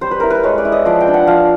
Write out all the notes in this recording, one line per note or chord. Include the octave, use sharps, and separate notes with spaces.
G3 C5
B4
E4 A#4
B4
G#3 C#5
D5
E4
D#5
F3 D5
G5
D4
F#5
F3 F5